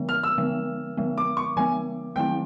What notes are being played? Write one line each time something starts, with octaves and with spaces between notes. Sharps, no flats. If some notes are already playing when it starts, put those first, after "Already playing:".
Already playing: D3 F3 G#3 B3
F6
E6
D3 F3 G#3 B3
D3 F3 G#3 B3
D6
C#6
D3 F3 G#3 B3 G#5
D#3 F#3 A3 C4 E4 G5